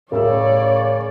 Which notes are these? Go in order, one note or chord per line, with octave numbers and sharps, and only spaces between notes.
A1 C#3 A#4 C#5 D5 E5 E6